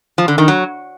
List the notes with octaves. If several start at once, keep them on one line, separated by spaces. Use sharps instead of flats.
F3
D3
D#3
F#3